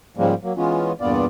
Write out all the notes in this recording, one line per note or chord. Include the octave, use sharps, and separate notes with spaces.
G#2 C#3 F3 G3 G#3 A#3
F#3 A#3
E3 G#3 B3 C#4 F4
E2 G2 A#2 B3 F4 D5